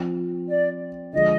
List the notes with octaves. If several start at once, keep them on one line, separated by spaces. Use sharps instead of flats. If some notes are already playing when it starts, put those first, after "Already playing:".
Already playing: F3 C4 F4
D5
D3 F3 G#3 D#5